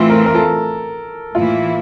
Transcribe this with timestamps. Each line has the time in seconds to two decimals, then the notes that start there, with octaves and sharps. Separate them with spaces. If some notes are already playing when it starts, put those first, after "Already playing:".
Already playing: A2 E3 A3 C4 F4
0.10 A#4
0.26 A#4
0.35 A4
1.35 A2 E3 A#3 E4 F4